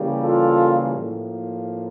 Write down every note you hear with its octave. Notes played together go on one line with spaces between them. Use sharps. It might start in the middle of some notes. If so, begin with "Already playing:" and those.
Already playing: C#3 E3 G3 A#3
F4 A4
A2 F3 A#3